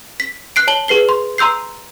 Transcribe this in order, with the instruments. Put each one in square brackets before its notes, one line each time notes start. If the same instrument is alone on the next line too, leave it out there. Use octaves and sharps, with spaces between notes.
[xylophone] B6
F#6 C7 D7
C#5 A5 F#7 G7
G#4 B4 C7 G7
C6
A#5 C6 E6 G6 C7